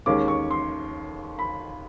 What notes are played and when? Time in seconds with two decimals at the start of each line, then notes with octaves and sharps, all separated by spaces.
0.06 D#2 D#3 G#3 C#4 D6
0.28 C#6
0.51 C6
1.39 B5